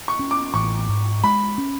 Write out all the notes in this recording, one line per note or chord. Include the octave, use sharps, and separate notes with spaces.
C#6
C#4
D6
A1 C#6
G#2
G#3 B5
C#4